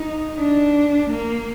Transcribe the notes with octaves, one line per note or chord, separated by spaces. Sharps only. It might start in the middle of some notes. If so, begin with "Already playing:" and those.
Already playing: D#4
D4
A#3